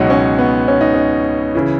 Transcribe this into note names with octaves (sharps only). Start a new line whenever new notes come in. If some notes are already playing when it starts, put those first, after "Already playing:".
Already playing: C#2 B2 F#3 D#4
C#4
B3
C#4
D#4
C#4
C#3 E3